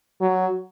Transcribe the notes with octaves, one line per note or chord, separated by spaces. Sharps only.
F#3